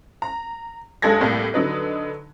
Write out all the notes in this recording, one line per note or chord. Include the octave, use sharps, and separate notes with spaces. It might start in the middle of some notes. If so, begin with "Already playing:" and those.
A#5
F#1 G2 G#3 A4 G#6 A#6
C2 A2 G3 A#3
D3 F#3 D#4 B4